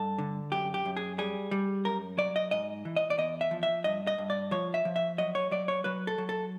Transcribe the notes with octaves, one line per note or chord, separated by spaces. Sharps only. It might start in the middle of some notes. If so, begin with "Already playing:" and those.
Already playing: G2 A4
D3
F#2 G4
G4
F#2
G#4
G3 G#4
G3
F#2 A#4
F#3 D5
D#5
G#2 D#5
E3
D#5
D5
E2 D#5
E5
F3
E5
G2 D#5
D#5
G2
D5
F3 C#5
E5
F3
E5
F#3 D#5
C#5
F#3 D5
C#5
F#3 B4
A4
F#3
A4